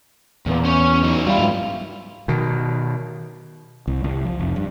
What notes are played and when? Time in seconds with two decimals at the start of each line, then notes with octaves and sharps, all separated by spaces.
0.46 E2 A#2 B3
0.65 C#4 C#5
1.03 F#3 D#4
1.27 G3 E4 F4
1.39 G#2 F#3
2.28 B2 D#3
3.87 C2
4.04 C2
4.25 F3
4.39 F1
4.56 G2